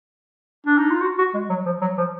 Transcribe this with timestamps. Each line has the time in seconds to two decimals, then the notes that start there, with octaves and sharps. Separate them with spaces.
0.66 D4
0.77 D#4
0.90 F4
1.01 F#4
1.18 F#4
1.34 G#3
1.49 F#3
1.66 F3
1.81 F#3
1.98 F3